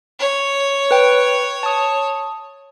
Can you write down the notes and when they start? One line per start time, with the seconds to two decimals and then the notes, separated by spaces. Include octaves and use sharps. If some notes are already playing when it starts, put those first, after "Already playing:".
0.19 C#5
0.91 B4 G5
1.63 A5 D#6